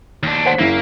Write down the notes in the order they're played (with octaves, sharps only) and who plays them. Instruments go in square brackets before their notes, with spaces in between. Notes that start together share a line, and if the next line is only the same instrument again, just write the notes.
[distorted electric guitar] D#2 D4
[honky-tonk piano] C5 F#5 B6
[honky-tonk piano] F#1 E4 [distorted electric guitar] A#3